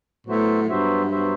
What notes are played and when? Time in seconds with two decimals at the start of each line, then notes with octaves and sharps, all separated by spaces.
0.27 A2 F#3 B3 F#4 C5 E5
0.69 G2 F#3 B3 F#4 C5 E5
1.11 F#3 B3 F#4 C5 E5